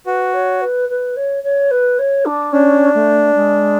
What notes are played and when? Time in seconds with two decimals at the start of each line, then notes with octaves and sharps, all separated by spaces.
0.06 F#4 B4
0.33 C#5
0.61 B4
0.89 B4
1.16 C#5
1.43 C#5
1.70 B4
1.98 C#5
2.25 D4
2.52 C#4 D4
2.94 A3
3.35 G#3